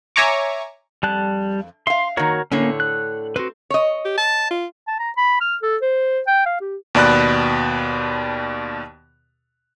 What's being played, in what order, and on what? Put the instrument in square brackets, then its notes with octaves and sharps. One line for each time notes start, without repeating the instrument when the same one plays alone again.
[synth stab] C#5 E5 G#5 A#5 C#6 D6
[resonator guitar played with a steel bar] F2 [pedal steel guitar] G3 A5 F#6
[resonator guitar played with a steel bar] E5 F5 [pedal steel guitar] C6
[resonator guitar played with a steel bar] D#3 A#3 [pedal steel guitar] F#4 A#4 C#5
[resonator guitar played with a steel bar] A2 D3 C#5 [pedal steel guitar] A#3 C#4
[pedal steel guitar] F#6
[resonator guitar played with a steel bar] C4 [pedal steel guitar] F#4 B4
[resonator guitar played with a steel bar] C#5 D#5
[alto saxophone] G4
A5
F4
[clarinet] A5
A#5
B5
F6
A4
C5
G5
F5
G4
[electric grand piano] D#2 B2 D5 B5 F#6